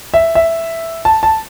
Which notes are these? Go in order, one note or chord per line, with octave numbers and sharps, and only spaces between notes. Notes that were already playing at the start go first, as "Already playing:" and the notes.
E5
E5
A5
A5